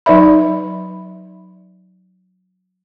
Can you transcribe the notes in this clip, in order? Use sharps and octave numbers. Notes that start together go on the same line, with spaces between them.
F#3 D#4 B4 D5 E5 B5